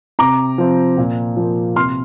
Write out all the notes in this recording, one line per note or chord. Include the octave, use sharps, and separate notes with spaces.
C3 A#5 D6
F3 C4
A#2
F3 A#3
C3 C6 F6